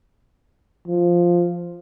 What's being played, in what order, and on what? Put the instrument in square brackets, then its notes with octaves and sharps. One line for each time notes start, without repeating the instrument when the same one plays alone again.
[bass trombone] F3